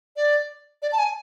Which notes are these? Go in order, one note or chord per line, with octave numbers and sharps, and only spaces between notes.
D5
D5
A5
G#5